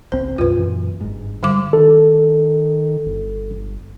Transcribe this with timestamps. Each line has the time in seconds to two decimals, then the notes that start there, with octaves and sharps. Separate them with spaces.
0.12 G#1 C#2 C4 C5
0.38 C2 F#2 B2 F4 B4
0.57 F#2 A#2 E3
1.01 G1 G#2
1.43 D3 G3 D6
1.73 D#3 A4
3.06 G1